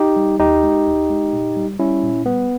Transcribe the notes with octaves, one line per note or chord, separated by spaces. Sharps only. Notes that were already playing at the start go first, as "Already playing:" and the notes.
Already playing: D#4 G4
G3
D#2 D#4 G4
G#3
D#2
G#3
A#2
G3
G3 C#4 E4
A#2
G3 B3